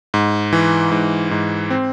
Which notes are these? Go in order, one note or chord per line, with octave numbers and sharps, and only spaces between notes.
G#2
E3
G#2
G#2
C4